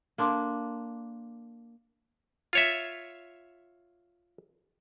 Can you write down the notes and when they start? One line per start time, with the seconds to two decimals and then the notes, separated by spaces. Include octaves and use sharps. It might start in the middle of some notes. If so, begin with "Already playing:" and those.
0.18 A#3 D4 A4 C6 D6
2.53 F4 C#5 E5